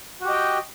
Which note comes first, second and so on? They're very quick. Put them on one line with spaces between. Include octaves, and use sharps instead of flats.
F#4 G4 D#5 G5